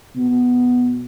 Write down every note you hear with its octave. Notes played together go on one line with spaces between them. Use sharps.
B2